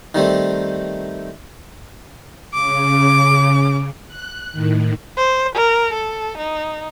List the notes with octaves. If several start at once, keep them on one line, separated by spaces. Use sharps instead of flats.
D#3 G3 A3 C4
C#3 D6
F#6
A2 D#3
C5
A#4
A4
D#4